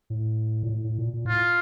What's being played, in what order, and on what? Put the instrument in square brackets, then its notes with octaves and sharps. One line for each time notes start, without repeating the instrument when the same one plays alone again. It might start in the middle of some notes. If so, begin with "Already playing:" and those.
[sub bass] A2
A#2
A2
A2
A#2
A#2
[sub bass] A2 [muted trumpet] F4